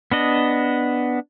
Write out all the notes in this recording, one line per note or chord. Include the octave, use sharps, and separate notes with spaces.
B3 D4 D#5